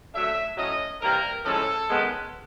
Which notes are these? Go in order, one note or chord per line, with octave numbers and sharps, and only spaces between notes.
F#2 D3 F#3 A3 E5
A2 F#3 A3 C#4 D#5
C3 E3 G3 A#3 A#4
A2 F3 G#3 C#4 A4
F#2 D#3 G#3 B3